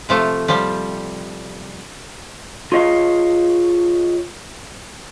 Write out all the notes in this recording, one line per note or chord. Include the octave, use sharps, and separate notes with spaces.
C3 F3 A3
F3 G3
F4 G#4 C#5 D#5 F5